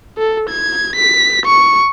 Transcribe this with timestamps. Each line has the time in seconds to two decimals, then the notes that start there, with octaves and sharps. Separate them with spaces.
0.18 A4
0.49 G#6
0.96 B6
1.45 C#6